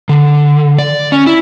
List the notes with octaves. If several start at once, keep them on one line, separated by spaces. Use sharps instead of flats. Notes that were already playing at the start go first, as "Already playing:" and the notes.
D3
D5
C#4
E4